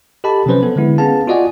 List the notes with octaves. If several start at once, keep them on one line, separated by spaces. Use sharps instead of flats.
G4 A4 D#5 A5 B5
C3 F3 F#3 C#4 B4 C5
B3 A4
D3 G#3 B3 E4
B3 C#4 G#4 F5 A5
F4 F#4 D5 D#5 F#5 G#5